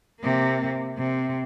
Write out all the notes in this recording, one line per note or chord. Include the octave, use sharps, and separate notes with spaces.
C3 A#3
C3